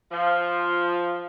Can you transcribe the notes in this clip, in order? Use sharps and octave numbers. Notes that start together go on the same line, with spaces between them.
F3